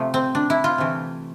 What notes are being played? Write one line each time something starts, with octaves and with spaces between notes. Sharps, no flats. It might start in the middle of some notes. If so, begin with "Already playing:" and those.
Already playing: C3 F3 A3
C4
D4
E4
F4
C3 E3 A3